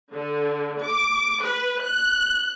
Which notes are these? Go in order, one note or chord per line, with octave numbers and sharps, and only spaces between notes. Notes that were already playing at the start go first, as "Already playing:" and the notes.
D3
D6
B4
F#6